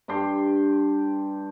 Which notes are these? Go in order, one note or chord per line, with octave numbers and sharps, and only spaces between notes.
G2 D4 G4 C6